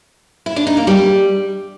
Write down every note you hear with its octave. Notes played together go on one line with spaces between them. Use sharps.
E4
D4
D#4
A#3
G3